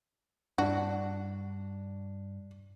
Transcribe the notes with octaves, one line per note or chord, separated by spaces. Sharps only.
G2 D4 F#4